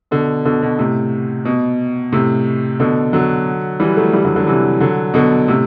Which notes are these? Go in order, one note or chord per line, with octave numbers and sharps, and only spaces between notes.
B2 D3
B2 D3
B2
A2 C3
B2
A2 C3
B2 D3
D3 F#3
E3 G3
F#3 A3
E3 G3
D3 F#3
D3 F#3
C3 E3
D3 F#3
B2 D3
A2 C3